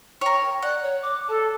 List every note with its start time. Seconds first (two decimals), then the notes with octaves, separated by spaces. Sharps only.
0.21 A#4 C#5 G5
0.63 D5 F#5
0.82 C#5
1.02 D6
1.28 A4 A5